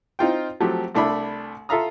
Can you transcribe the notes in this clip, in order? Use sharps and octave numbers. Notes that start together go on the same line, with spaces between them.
C4 D#4 F4 G5
F3 F#3 A3 C4 G4
C2 A3 D4 E5 B5
F4 A4 E5 F5 A#5 D#6